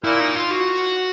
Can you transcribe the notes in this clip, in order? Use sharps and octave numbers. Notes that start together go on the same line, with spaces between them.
A#2 E4
D#4
F4
F#4